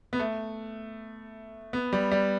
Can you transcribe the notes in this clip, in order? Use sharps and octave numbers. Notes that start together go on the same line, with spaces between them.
B3
A3
B3
G3
G3